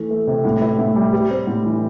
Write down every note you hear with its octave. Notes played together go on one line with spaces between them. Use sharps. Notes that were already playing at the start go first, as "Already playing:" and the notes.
Already playing: E3 A3
A3
C3
A2
E4
A2
G3
G4
C4
A2
E3